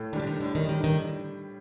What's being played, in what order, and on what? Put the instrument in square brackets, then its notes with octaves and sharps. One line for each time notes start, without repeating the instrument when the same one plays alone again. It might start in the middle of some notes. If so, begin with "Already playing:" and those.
Already playing: [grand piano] A2
[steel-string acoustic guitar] D#3 [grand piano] D4
[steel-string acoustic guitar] D3 [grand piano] G3
[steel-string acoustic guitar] D#3
[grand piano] A2 [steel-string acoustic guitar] D3
[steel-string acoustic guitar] D#3
[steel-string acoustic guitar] D#3 [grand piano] G3 D4
[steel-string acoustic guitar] D#3